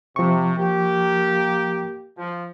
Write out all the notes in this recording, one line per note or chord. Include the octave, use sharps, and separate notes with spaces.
C3 F3 C#6
A#3 G4
F3